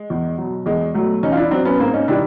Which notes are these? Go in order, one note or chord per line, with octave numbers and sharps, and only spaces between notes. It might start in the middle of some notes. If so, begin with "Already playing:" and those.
Already playing: G#3
E2
B2 F#3
E2 G#3
B2 F#3 A3
E2 C#4 D#4
F4
D4 E4
B2 F#3 C4 D4
B3 C#4
G#2 A#3 C4
C#4 D#4
D#3 G3 D4 E4